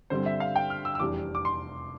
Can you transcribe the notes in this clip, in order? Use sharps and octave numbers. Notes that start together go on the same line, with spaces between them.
G2 D3 G3 C4 C5
E5
F5
G5
F6
E6
E6
F1 E2 C3 G3 D4 D6
D6
C6